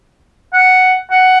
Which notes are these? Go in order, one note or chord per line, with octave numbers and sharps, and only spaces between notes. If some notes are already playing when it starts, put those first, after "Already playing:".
F#5
F#5